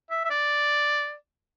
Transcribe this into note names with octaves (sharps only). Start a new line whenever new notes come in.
E5
E5
D5